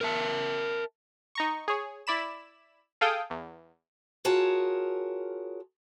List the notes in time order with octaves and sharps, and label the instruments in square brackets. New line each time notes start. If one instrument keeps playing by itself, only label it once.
[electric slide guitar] A#4 E5 A5
[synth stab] D#4 A#5 C#6
G#4 C#5
E4 D5 B5 E7
G#4 A4 F5 G5 D#6
E2
[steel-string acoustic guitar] F4 F#4 G#4 A#4 C#5 A5